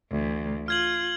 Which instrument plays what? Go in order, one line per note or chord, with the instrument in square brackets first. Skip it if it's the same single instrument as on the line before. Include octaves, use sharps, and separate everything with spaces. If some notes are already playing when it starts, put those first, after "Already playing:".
[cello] D2 E3
[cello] F4 [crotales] F6 G#6 F#7